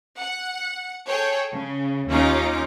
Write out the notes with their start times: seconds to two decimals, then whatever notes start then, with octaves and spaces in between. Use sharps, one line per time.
0.19 F#5
1.07 G#4 A4 C#5 G5
1.52 C#3
2.09 D#2 C#4 D#4 F4 D6